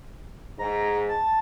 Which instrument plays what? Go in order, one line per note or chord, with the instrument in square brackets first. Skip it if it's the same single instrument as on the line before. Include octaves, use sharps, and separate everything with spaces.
[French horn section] G#2 [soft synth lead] A#5
[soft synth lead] A5